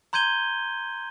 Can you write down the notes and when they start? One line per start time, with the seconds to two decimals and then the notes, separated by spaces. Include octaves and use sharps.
0.13 A#5 C6 G6 G#6 D#7 G7